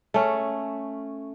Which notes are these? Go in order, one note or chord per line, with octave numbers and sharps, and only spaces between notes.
A3 C#4